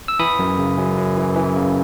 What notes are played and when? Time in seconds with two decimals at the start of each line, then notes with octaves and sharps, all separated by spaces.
0.08 E6
0.19 E3 B5 D#6
0.39 F#2
0.58 C#3
0.78 F#2
0.98 F#2
1.17 E3
1.36 E3
1.56 C#3